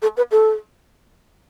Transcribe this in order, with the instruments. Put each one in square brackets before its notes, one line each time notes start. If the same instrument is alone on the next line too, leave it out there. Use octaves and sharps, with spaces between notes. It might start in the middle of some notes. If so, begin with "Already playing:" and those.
[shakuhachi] A4
B4
A4